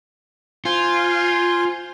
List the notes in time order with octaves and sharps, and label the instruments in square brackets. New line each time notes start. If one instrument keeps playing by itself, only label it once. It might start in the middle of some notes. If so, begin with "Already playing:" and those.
[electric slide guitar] F4 [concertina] C5 G#5 C6